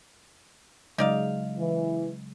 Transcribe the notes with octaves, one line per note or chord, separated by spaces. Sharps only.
C#3 F#3 G#3 D#4 D5 F5
E3